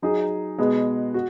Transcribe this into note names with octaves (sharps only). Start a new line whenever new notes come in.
F#3 D#4 G#4
B2 G#3 B3 G#4
F#4